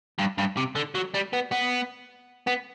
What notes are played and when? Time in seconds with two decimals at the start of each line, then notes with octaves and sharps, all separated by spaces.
0.18 G2
0.38 G2
0.57 C3
0.75 D3
0.95 F#3
1.14 G3
1.33 B3
1.52 B3
2.47 B3